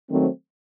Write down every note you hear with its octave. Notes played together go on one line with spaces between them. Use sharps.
D#3 F#3 A3 C4